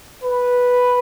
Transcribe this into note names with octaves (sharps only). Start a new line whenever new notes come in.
B4